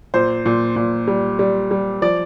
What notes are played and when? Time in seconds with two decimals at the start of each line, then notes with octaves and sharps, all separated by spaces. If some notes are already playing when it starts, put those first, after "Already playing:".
0.14 A#2 C5
0.46 A#2
0.76 A#2
1.07 G3
1.39 G3
1.71 G3
2.02 F3 D5